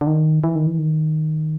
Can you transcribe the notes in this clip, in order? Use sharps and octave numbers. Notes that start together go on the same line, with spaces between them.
D3
D#3
E3
D#3
E3
D#3